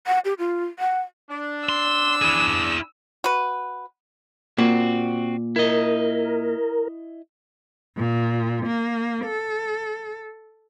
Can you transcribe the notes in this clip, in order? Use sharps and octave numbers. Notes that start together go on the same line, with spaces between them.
F#5
G4
F4
F#5
D4
C6 E6
E4 G#4
F#4 B4
A#2 C4 F#4
E4 A#4 D#5
A#2
A#3
A4